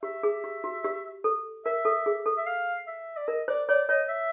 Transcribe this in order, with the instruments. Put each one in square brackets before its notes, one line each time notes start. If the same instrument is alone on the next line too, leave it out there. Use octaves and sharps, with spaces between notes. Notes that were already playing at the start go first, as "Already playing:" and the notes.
[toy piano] G4 [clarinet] E5
[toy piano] G#4
G4
F#4
G4
A4
[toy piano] A#4 [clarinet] E5
[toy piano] A4
G#4
A4
[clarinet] E5
F5
E5
D5
[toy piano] A#4 [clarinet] D#5
[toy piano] C5 [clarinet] D5
[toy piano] C#5 [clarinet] D5
[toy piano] C#5 [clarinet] D#5
[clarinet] E5